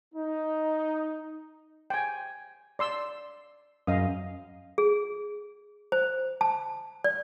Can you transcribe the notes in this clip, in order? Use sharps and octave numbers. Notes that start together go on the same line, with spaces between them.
D#4
G5 G#5
D5 C6 E6
F#2 D#5 F5 D#6
G#4
C5
A5
D5